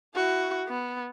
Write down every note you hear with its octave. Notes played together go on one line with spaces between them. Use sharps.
E4 F#4
B3